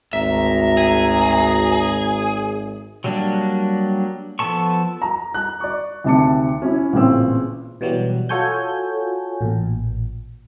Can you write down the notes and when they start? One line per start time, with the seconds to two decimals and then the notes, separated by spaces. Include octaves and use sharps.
0.13 G#1 D2 E5 A#5
0.77 G#4
3.04 F#3 G3 A#3 D4
4.39 F3 B3 A4 A5 C#6
5.02 A#5
5.34 A#5 F#6
5.60 D5 C#6
6.04 D2 C3 D#3 A5 D6 C#7
6.62 C#4 E4
6.93 A1 A#2 C#3 C4 E6
7.81 B2 E3 F#3 G3
8.29 F4 F#4 A4 C#5 G#5 G6
9.41 A1 A#2